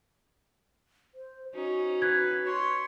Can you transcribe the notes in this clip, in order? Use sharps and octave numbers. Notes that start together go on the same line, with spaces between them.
C5
C#4 D#4 F#4
B4 G#6
C#5 C6